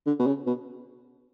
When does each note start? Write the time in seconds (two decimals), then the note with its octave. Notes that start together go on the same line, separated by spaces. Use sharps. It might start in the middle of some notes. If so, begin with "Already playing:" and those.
0.06 D3
0.19 B2
0.27 C#3
0.47 B2